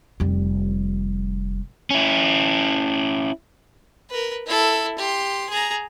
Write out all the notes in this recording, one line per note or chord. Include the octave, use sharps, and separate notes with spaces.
F1 G3
C#4 E4
A#4 B4
E4 A4
G4 C6
G#4 A#5